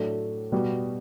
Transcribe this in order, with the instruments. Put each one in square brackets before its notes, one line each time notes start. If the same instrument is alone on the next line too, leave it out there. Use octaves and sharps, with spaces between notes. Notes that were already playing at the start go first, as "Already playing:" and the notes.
Already playing: [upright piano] A2 F#3 A3 D4
B2 G3 B3 F#4